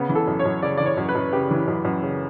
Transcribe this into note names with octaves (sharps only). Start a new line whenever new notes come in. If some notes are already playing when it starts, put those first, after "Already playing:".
Already playing: C#3 B3
E3
A4
F#2
C#5
F#2
C#3 D5
E3 D5
C#5
F#2
B4
F#2
C#3 G4
E3
F#2
F#2
C#3